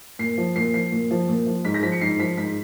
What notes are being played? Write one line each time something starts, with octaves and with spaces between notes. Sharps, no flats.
A#2 C7
F3
A#2 C7
F3 C7
A#2
F3
A#2
F3
G#2 B6
A#6
F3 B6
C#7
G#2 C7
F3 B6
G#2 B6